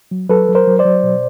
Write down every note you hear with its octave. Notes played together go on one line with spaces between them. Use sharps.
F#3
F#3 A4 B4
F#3
A#4 C5
F#3
C5 D5
F#3
B2